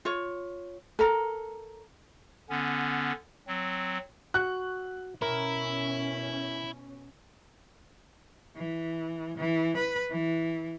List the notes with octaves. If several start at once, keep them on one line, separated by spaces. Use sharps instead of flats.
F4 C#5
A4 A#4 A#5
D3 B3 C#4
F#3 C4
F#4 F#6
B2 C#4 E4 A#4
E3
E3
B4
E3